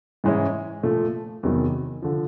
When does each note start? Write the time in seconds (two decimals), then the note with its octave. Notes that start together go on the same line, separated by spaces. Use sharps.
0.24 G#2 E3 G#3 C#4 E4
0.83 A#2 F3 A3
1.43 E2 C3 D#3 F#3
2.02 D3 F3